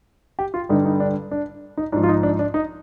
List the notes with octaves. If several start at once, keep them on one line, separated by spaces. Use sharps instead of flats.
G4
F4
G2 D3 G3 D#4
D#4
D4
D4
D#4
G#2 F3 D4
F4
D#4
D4
D4
D#4